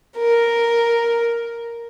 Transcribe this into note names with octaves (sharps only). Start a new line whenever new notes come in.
A#4